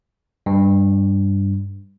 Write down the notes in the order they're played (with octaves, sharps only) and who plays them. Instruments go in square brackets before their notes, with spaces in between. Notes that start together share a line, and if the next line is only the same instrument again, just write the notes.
[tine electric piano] G2